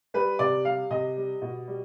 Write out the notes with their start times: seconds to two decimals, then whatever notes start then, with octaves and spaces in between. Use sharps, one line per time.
0.14 G3 B4
0.39 C3 D5
0.65 G3 F5
0.90 C3 D#5
1.17 G3
1.42 B2
1.68 G3